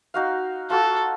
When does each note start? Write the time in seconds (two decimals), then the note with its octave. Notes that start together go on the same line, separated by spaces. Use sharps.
0.14 D#4 F#4 F5
0.70 F4 F#4 A4